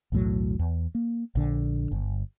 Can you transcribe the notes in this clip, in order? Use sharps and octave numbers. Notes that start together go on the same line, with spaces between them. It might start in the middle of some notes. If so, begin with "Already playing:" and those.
B1 E2 A2 F#3
E2
A#3
A#1 D3
G1